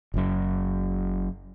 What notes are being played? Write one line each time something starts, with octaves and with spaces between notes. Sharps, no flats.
F#1 F#2